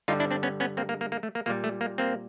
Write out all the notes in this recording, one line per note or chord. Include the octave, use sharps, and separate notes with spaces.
G2 D3 G3 D#4 F4
D4 E4
C4 D4
B3 C#4
B3 C#4
A#3 C4
A#3
A#3
A#3
A3
A#3
A#2 G3 A#3
A3
A#3
A#3 C4